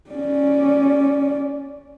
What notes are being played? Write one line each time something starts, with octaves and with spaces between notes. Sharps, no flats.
C#4 D5